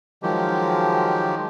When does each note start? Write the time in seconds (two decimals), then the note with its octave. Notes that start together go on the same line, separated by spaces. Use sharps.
0.23 D#3 F3 F#3 G#3 G4